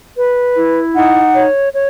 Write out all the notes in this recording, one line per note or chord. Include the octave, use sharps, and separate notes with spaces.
B4
E4
D#4 F#5
C#5
C#5